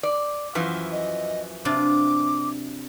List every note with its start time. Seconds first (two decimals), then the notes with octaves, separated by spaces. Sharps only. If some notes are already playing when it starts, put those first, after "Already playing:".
0.03 D5
0.55 F#2 E3 F3
0.92 D#5
1.65 C3 D4 F4 D6